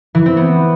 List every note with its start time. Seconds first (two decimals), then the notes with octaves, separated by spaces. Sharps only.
0.15 E3
0.26 C4
0.37 B3